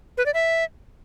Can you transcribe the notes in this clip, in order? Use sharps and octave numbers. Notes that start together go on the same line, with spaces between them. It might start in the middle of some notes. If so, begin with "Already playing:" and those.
B4
D5
E5